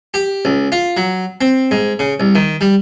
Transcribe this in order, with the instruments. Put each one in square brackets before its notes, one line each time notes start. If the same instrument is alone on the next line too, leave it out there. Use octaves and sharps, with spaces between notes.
[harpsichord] G4
C#2
F4
F#3
C4
G#2
C#3
C2
D#3
G3